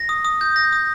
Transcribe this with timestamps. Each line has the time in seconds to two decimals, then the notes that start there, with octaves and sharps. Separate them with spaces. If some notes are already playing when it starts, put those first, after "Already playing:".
Already playing: A#6
0.09 D#6
0.25 D#6
0.41 G6
0.56 A#6
0.73 D#6